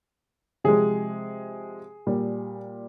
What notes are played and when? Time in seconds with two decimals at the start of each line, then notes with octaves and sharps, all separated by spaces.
0.64 C3 F3 G#3 G#4
2.07 A#2 G3